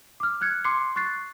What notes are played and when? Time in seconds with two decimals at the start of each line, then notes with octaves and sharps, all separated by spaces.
0.20 D6 F6
0.41 F6 F#6 G#6 C#7
0.64 C6 D6 C7 C#7
0.96 C#6 F#6 A6 C7